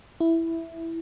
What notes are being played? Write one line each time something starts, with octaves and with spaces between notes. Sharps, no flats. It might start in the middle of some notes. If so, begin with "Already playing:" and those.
E4